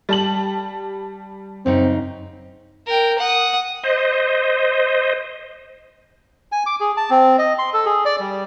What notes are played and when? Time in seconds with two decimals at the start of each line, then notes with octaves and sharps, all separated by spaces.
0.09 G3 A5 F#7
1.66 F#2 C#3 C4 D#4
2.86 A#4 G5
3.19 F#5 D#6
3.83 C5 D#5
6.52 G#5
6.66 D6
6.80 G#4
6.97 A5
7.10 C4
7.38 D#5
7.59 C6
7.73 A4
7.86 G#4
8.05 D5
8.20 G3